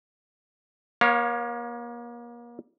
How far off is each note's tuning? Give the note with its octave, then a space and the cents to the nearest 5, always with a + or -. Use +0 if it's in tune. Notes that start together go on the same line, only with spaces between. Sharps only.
A#3 +35 C#5 +0 F5 +10